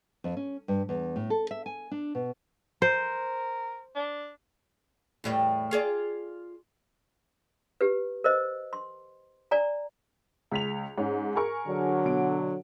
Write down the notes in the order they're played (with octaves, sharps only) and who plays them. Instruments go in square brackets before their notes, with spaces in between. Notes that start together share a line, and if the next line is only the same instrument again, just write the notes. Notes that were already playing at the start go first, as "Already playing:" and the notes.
[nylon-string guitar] F2
C#4
G2
E2
A2
A4
E5
G#5
D4
B2
[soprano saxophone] A#4 [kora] C5
[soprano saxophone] D4
[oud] E2 A2 G3
F4 G#4 D5
[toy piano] G4 B4
A#4 C5 D#5
C6
D5 G#5 A#5
[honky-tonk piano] C#2 B6 F7
G#2 C#4
G#4 A#4 C#6
[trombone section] D3 F#3
[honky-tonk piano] B2 D7